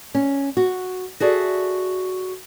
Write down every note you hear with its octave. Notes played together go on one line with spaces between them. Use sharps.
C#4
F#4
F#4 G#4 A4 D5 E5